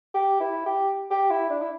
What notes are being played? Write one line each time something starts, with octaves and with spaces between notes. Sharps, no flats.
G4
E4
G4
G4
E4
D4
E4